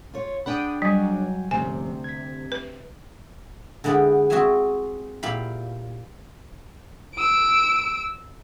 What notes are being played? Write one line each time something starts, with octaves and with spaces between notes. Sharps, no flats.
F4 C#5
B3 D4 G#4 F#5 G5 B5 D#6
F#3 G3 G5 G#5
D2 G#2 C3 F3 C#4 G#5
G#6 B6
B4
D3 G#3 B3 E4 G4
C4 F#4 G#4 C#5 E5 G#5
A#2 E4 G4 F5 B5
E6 D7